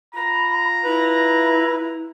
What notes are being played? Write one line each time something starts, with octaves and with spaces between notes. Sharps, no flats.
F4 A#5 B5
E4 B4